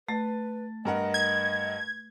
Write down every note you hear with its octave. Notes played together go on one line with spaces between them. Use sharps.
A3 B4 A6
G2 A#4 D#5 F#5
G#6